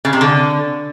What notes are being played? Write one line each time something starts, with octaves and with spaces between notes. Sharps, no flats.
C#3
C3
D3